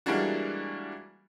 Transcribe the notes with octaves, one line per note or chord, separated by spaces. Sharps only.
E3 G3 G#3 A#3 D4 F#4